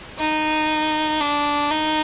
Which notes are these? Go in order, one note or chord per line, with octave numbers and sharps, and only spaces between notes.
D#4
D4
D#4